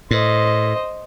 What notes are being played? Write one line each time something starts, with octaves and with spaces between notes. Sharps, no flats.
A2 C5 D#5